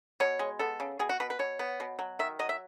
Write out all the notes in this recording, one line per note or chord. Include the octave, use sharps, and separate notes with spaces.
B2 C#5
G#3
B3 A4
C#3
B2 G#4
F#4
B2 B4
B4
B2 C#5
B3
B2
F#3
D#3 E5
F#3 D#5
E5